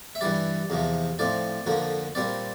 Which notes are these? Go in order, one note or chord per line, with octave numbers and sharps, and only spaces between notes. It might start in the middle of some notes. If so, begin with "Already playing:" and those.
E5
G2 E3 G3 D5
E2 C3 F3
A2 F3 C4 D5
F2 D3 F3 A#3
A#2 G3 C4 D5